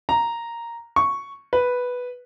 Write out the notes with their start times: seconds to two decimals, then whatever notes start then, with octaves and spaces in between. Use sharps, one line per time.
0.09 A#5
0.96 C#6
1.53 B4